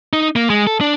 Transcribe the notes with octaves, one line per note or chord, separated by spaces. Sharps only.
D#4
A#3
G#3
A4
D4